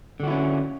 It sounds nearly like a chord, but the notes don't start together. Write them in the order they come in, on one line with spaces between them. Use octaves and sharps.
D3 F#4 E4 C#4